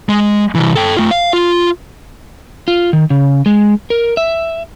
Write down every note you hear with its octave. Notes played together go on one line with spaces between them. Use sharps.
G#3
C2 E3
A4 G5
A3 F4
F5
F4
F4
D#3
C#3
G#3
A#4
E5